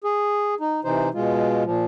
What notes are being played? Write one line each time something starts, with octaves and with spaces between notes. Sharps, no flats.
G#4
D#4
C3 E3 D#4 C5
B2 G#3 F4
A#2 F3